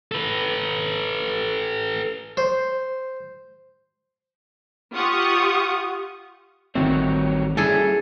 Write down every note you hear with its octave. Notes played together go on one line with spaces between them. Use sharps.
A4 B4
C5
F4 G4 F#5 C#6 D#6
A1 D#3 G3 A3 C4 F#4 C#5
G3 C#4 E4 G#4 A4